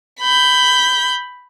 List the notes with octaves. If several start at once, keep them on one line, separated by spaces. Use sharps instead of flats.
B5 G6